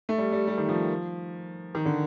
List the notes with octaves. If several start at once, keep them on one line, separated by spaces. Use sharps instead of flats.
A3
G3
G3
G3
D#3
F3
D#3
D3